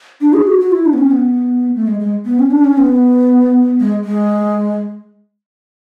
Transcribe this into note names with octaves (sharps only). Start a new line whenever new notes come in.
D4
G#4
F#4
F#4
E4
D4
B3
C#4
B3
A3
G#3
G#3
B3
C#4
D4
C#4
B3
G#3
G#3